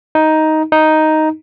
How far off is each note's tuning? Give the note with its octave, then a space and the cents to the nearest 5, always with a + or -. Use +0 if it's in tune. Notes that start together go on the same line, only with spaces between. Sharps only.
D#4 +10
D#4 +5